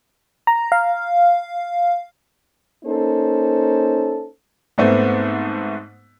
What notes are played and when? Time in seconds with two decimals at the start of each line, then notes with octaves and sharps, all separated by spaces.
0.47 A#5
0.72 F5
2.84 A#3 C#4 D#4 A4 C5
4.78 G#2 A3 B3 C4